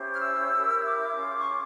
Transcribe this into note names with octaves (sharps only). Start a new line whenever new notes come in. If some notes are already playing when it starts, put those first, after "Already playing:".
Already playing: C#4 E4 G4 C5
F6
E6
E4 G4 A#4
D6
C#4 F4 G#4
C#6
D6